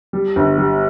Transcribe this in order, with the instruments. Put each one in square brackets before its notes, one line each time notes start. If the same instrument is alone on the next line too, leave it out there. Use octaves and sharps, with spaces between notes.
[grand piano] G3
G1
G3